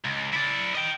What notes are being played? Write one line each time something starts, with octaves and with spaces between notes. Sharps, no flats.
C#2
E4 D5
D#5 G5